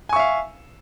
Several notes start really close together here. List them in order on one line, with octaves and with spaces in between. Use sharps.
G#5 C#6 E5 F5